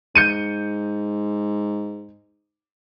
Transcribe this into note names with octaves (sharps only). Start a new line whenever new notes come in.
G#2 G6 C#7 D#7